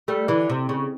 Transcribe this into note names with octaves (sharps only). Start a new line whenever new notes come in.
G3 A3
D3 E3
C3
C#3